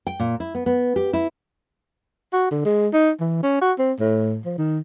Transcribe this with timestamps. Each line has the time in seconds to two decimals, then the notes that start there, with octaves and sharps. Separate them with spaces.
0.07 G5
0.20 A#2
0.40 E4
0.55 B3
0.66 B3
0.96 G4
1.13 E4
2.33 F#4
2.51 D3
2.65 G#3
2.94 D#4
3.20 E3
3.43 C#4
3.62 F#4
3.79 C4
4.00 A2
4.45 F3
4.58 D#3